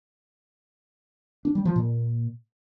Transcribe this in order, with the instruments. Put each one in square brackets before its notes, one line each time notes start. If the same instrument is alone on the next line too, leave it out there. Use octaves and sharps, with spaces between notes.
[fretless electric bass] D4
G3
F3
A#2